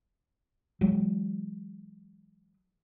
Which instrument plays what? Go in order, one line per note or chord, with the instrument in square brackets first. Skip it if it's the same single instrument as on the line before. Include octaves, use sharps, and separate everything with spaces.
[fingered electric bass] E3 F#3 G#3